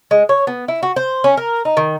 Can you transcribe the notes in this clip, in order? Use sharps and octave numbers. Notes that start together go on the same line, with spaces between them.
G#3
C#5
B3
E4
F#4
C5
C#4
A#4
D#4
D#3